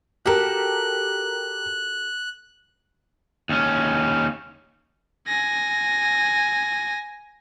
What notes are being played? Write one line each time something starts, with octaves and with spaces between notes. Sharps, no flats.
F#4 G4 A4 A#4 F#6
D#2 C#4
G#5 A#6